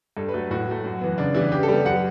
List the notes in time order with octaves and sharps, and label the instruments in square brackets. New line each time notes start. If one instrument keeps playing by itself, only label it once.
[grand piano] G2 A4
B4
F#3 A3
A2 F#4
F#3 A3
F#2
E3 B3
C#3 D4
E3 G3 B3 E4
C#3 G4
A4
G3 B3
F#2 F#5